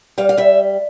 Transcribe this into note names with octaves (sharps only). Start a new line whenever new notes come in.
G3 F5
F5
G3 E5